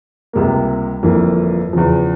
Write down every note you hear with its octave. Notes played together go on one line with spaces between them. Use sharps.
C#2 C3 G3 A#3
G1 F2 E3 A#3 E4
E2 C#3 F3